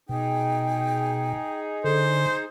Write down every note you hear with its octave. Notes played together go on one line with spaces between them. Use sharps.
B2 D#4 G#4 G5
D3 C5